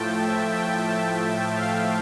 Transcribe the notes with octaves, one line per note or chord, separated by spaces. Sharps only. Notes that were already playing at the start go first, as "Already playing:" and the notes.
Already playing: A2 F3 A3 G5 A5
E5
G5
A5
F5